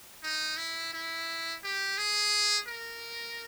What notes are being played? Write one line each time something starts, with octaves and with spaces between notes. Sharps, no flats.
D#4
E4
E4
G4
G#4
A#4